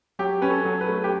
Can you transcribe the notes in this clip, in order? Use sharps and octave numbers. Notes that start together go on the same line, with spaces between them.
F#3 G4
C#4 B4
A4
F#3
B4
A3
G4